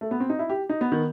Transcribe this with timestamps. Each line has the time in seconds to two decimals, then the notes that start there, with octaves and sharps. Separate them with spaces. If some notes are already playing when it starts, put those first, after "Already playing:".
0.01 A3
0.11 B3
0.20 C4
0.30 D#4
0.39 E4
0.50 G4
0.69 D#4
0.81 B3
0.92 D#3